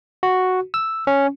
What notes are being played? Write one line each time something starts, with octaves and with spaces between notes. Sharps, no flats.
F#4
E6
C#4